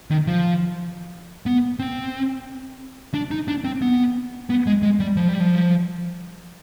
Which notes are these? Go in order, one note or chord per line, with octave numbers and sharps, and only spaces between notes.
D#3
F3
B3
C4
D4
D#4
D4
C4
B3
B3
G#3
G#3
G3
F3
G3
F3